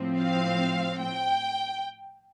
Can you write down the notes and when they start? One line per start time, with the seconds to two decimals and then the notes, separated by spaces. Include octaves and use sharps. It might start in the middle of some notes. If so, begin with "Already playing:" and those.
Already playing: A2 F3 C4
0.20 F5
0.99 G5